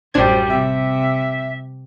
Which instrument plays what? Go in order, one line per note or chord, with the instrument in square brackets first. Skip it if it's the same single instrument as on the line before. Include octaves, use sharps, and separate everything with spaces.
[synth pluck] A1 D4 G#6 [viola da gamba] F#2 G3 [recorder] C5
[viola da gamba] C3 [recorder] E5